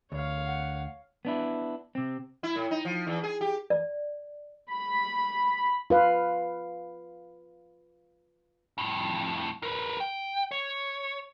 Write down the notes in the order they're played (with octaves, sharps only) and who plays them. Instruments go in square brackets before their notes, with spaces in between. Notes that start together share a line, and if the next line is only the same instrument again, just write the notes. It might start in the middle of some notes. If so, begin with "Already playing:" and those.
[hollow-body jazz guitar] D2 [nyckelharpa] C#5 F5
[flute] F#5
[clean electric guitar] B3 D4 E4
C3 C4
[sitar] E4
A2
D#4
F3
E2
G#4
G4
[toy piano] D5
[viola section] B5
[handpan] F4 B4 F5
[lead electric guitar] F2 A2
A#4 B4
G5
C#5